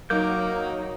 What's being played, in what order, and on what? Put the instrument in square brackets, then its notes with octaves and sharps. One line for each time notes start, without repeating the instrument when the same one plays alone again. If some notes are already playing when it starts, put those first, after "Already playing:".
[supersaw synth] F#3 D#4 [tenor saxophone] A#3 [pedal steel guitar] D6 G6